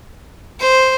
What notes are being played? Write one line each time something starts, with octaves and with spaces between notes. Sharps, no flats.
C5